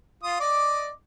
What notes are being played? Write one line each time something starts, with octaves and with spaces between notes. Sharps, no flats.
F4 D#6
D5 D#5 D6